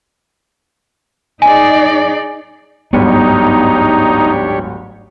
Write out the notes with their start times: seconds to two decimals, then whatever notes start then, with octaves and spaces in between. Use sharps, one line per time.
1.42 D#4 G#4 D5 G#5
2.93 D1 G1 G#2 B3 D4 D#4 G4 C#5